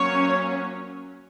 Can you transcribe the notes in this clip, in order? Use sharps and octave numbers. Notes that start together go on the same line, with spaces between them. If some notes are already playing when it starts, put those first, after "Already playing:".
Already playing: F#3 A#3 C#4 C#5